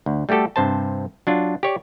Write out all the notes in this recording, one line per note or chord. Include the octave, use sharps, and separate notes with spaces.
D2
G3 A3 F#4 G4 A4
G2 C3 C5 A5
F#3 D4 F4
G4 C#5 D5